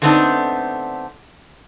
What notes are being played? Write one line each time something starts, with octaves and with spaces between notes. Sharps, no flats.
D3 A3 B3 C4 D4 D#4